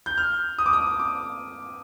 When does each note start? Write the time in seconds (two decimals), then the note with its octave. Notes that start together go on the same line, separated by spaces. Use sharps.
0.06 G6
0.18 F6
0.59 D#6
0.66 D6
0.73 D#6
0.99 D6